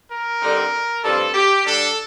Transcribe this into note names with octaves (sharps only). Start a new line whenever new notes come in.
A#4
D3 G3 C4 D#4
G2 F3 C4 A4
G4
D3 G3 D4 A4